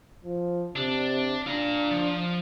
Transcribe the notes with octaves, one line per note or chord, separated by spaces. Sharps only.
F3
C3 D4
D4 F4 A#5
F3